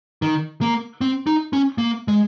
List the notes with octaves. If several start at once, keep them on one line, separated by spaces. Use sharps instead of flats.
D#3
A#3
C4
D#4
C#4
A#3
G#3